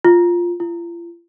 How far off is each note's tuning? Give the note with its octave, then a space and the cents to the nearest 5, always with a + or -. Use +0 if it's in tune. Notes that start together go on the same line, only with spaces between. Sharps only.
F4 +0
F4 -40